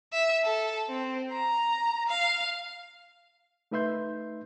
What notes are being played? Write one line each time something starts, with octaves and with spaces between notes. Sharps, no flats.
E5
A4
C4
A#5
F5
A3 D#4 B4 E5 C6 G6